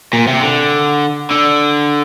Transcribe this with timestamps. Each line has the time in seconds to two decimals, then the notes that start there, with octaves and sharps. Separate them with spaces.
0.13 A#2
0.27 C3
0.40 D3
1.31 D3